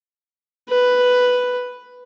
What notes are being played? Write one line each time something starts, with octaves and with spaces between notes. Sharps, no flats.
B4